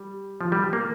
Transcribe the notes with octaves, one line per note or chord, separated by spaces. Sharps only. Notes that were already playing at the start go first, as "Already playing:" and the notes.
Already playing: G3
F3
G3
A#3